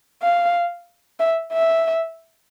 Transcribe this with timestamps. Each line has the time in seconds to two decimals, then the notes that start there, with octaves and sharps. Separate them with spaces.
0.22 F5
1.20 E5
1.52 E5